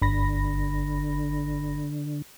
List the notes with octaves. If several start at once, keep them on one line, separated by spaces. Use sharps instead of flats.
G1 D3 B5 A#6